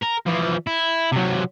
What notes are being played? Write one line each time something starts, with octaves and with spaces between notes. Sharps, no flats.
A#4
E3 F3
E4
C3 F#3